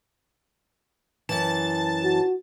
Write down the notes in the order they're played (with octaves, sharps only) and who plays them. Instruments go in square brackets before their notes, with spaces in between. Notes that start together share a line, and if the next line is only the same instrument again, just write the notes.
[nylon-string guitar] F#2 E3 [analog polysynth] A5 A6
[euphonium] F#4